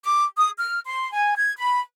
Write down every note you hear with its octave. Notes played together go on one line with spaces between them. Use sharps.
D6
D#6
F6
C6
G#5
G#6
B5